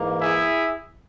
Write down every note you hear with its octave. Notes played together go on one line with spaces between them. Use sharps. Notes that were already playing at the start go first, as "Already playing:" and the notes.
Already playing: G#2 E3 A#3
E4 G#4